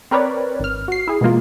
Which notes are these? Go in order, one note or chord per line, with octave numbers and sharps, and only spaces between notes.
C4 A#4 B4 C#5 D5
G#1 F6
F#4 C7
E4 G#4
B2 E3 G#3 A#3 F4